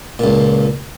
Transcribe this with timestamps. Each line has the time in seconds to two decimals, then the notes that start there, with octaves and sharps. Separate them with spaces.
0.19 C#2 A#2